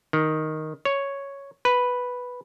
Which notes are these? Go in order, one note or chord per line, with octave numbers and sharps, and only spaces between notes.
D#3
C#5
B4